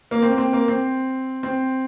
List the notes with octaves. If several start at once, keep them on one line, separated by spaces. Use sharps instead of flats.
A#3
C4
A#3
C4
A#3
C4
C4